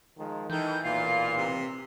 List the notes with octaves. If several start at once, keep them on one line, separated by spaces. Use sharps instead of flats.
D#3 F3 G#3
D#3 E3 D#4 A4 G6
B1 A#2 F4 C7
C3